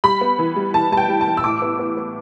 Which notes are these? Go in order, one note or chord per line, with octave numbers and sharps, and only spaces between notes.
G3 B5
B3
E3
G3
E3 A5
G3 A5
G5
G3
A5
E3
E6
A2 D6
B3
B3
B3